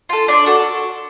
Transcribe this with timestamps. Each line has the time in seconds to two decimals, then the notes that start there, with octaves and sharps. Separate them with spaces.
0.09 F4 A4
0.28 D4 D5
0.46 F#4 A4